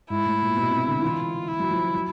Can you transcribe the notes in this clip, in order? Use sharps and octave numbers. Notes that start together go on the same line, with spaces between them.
G#2 E4
A2
A#2
B2
C3
D3
E3 F4
E4
F#3
F3
F#3